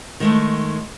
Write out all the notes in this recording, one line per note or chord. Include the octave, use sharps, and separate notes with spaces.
D#3 G#3 A3